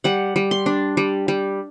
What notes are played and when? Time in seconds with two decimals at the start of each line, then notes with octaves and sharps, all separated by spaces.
0.04 G3 F#5
0.36 G3
0.51 C6
0.66 D4
0.97 G3
1.28 G3